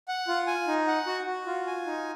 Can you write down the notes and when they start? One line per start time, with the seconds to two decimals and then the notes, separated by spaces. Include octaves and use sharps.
0.08 F#5
0.28 F4
0.47 G#5
0.67 D#4
0.87 F#5
1.06 F#4
1.26 F#4
1.46 F4
1.67 G#5
1.86 D#4